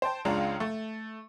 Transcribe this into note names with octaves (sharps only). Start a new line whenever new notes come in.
C5 G5 A5
C#2 C#3 G#3 D4 F4 A#5
A3